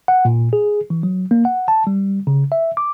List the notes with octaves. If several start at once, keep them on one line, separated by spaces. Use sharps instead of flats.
F#5
A#2
G#4
E3
F#3
A#3
F#5
A5
G3
C#3
E5
D6